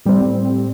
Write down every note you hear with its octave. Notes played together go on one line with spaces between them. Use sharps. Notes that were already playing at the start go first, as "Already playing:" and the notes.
A2 G3 C4